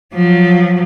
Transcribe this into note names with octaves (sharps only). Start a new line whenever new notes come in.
F3 F#3